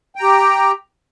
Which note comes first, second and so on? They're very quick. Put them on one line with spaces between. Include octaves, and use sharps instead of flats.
G5 A#5 G4